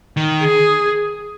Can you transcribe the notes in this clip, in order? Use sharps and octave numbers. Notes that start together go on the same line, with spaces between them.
D#3
G#4